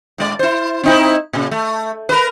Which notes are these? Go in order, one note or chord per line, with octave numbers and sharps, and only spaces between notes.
A2 G#3 D5
E4 C5
C4 D#4 E4
A#2 C#3
A3
A#4 B4